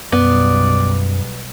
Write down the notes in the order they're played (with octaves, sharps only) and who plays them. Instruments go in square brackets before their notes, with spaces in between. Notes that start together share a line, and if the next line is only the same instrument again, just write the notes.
[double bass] B1 G3 [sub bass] F#2 [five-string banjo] B3 [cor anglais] D5